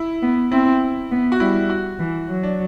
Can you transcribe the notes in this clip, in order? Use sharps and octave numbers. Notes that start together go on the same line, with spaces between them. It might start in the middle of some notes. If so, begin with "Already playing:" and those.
Already playing: E4
B3
C4 E4
B3
F#4
G3 E4
F#4
E3
F#3
D4